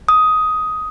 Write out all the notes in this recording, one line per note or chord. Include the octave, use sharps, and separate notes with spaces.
D#6